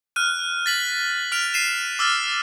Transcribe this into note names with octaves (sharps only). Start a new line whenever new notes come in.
F6 F#6 D#7
A6 B6 F#7
F6 D7 F7
C7 D#7 E7
D6 E6 F6 A6